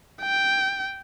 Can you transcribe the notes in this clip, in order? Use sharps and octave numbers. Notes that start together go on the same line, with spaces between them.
G5